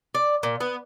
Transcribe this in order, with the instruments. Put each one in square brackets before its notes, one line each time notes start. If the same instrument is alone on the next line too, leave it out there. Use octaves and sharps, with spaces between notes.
[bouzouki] D5
A#2
B3